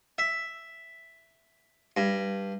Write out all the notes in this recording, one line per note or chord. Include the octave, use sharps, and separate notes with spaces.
E5
G2